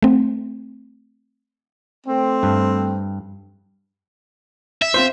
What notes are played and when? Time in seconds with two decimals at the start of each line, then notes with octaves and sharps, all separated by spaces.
0.02 A3 C4
2.07 A3 C4
2.43 G2
4.82 E5
4.94 C4 F4 C5